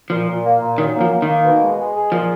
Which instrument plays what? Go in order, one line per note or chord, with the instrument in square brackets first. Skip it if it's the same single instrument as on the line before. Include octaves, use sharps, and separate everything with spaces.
[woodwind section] A#2 [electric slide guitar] F3
[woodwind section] A#2
A#3
A#2
[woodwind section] F#2 [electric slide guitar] D#3
[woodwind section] A#3
[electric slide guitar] F3
[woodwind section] A#3
[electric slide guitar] D#3
[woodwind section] A#3
B2
G#3
G#3
G#4
[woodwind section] A#2 [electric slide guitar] F3